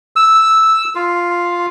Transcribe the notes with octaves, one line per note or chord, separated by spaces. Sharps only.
E6
F4